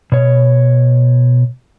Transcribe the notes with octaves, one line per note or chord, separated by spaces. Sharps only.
B2 C#5